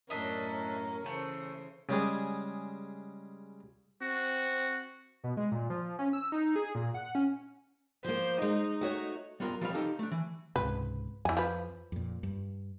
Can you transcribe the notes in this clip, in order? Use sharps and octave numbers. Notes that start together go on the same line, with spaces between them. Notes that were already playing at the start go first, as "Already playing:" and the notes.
F#2 A2 C#4 D4 A#4 D#5 E5
C#3 E3 A3 C5
C#3 G3 G#3 G#4
C4 F#4
B2
G#3
A#2
F3
C#4
E6
D#4
G#4
A#2
F#5
C#4
F3 A#3 C5
G#3 D#4
A3 F#4 C#5
G3 B3 F4 A#4
F3 G3 C4 B4 F5
D#4 G4 A4 F5 A5
A3 D4
E3
C#2 G#2 C3 B4
F2 E3 G#5
F3 B4
F2 A#2
G2